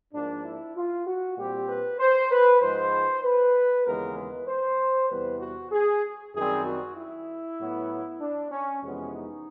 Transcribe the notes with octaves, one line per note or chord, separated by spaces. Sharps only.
G#2 F3 A#3 D4
E4
F4
F#4
A#2 G3 C4 G4
B4
C5
B4
G#2 F3 G#3 C5
B4
D#2 C#3 E3 G#3 B3 A#4
B4
C5
E2 C3 E3 G3 B3 B4
F#4
G#4
F#2 D#3 G3 C4 G#4
F#4
E4
A2 F#3 B3
D4
C#4
F2 C3 E3 G#3 B3 C#4
D#4